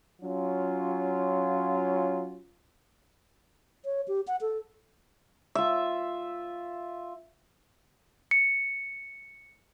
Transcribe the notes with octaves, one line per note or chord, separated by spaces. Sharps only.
F#3 C#4 F4
C#5
G4
F#5
A4
F4 E5
C#7